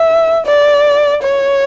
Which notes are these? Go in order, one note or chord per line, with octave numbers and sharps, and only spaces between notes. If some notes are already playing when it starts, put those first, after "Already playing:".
Already playing: E5
D5
C#5